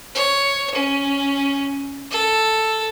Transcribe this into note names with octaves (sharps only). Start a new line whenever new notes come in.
C#5
C#4
A4